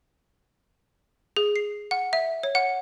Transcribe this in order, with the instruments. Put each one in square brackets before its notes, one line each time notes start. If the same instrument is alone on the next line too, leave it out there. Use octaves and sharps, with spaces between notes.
[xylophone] G#4
C7
F#5
E5
C#5
F#5